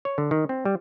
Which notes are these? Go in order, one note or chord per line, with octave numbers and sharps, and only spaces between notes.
C#5
D3
D#3
C4
G3